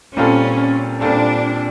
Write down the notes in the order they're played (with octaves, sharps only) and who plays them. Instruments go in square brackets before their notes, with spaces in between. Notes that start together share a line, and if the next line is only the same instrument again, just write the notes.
[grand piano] A#2 G3 C4 F4 A4 [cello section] C#4
[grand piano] A#2 G3 C4 F4 A4 [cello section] D4